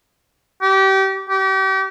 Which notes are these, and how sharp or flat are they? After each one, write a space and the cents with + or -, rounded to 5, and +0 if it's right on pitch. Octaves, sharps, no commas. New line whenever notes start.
G4 -30
G4 -35